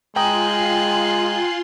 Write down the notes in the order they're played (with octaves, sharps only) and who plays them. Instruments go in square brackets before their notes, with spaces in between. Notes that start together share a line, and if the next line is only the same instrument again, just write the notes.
[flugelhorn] G#3 [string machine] F4 C6 [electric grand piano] G5 A#5 D#6 [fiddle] G#5 F#6